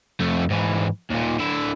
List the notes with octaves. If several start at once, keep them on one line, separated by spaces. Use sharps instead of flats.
F2 A3
G#2 E3
D#2 A#2
D3 E4